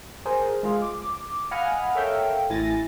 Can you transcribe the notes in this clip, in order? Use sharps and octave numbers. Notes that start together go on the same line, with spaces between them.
G#4 A#4 C5 G#5
G#3 F4 G#4
D6
D#5 F5 F#5 G#5 B5 F6
A4 A#4 C#5 E5 F5 G5
A1 E4 G#5 A6 A#6